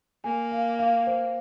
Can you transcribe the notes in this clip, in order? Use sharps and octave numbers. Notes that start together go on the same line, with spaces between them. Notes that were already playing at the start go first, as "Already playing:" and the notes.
A#3 G#5
F5
F5
C5